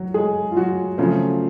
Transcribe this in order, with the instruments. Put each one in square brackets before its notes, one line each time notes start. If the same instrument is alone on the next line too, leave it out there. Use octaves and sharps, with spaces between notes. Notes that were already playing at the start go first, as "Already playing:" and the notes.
Already playing: [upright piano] F#3 F#4
G#3 G#4
F4
F#3 F#4
C#3 F3 F#3 A3 C4 F4